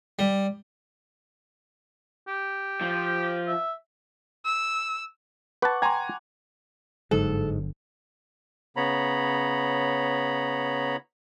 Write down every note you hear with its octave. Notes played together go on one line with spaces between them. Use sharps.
G3
G4
F3
E5
E6
B4 F#5 A5 C#6 D6
G5 G#5 A#5 C6 G#6
G1 G#2 D3 F#3 A4
C#3 B3 C#5 A#5 B5